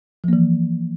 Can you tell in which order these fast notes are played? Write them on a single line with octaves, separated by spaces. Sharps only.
F3 A#3 E3